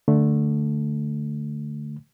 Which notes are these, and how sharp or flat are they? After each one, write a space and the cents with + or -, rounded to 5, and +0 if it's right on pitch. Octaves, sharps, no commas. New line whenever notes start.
D3 +0 A3 +0